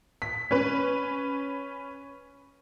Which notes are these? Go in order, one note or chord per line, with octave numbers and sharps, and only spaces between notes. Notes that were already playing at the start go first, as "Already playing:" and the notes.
B6
C#4 B4